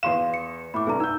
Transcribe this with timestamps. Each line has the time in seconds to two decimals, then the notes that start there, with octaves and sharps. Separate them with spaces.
0.03 E2 F5 C6 E7
0.34 C#7
0.74 A2 B5 D6
0.87 C2 G2 A4 A#5
1.00 D#4 E6 G6